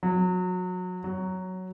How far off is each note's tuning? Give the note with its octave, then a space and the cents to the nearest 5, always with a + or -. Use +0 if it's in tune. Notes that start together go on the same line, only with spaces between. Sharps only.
F#3 -25
F#3 +5